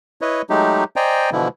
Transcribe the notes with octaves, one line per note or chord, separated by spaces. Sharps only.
E4 B4 C#5 D#5
F#3 G#3 A3 D#4 G4
C5 D5 D#5 G5 G#5 A#5
B2 D3 E3 F3 E4